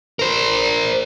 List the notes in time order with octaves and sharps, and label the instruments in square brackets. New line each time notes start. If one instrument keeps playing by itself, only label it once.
[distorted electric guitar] A#4 C5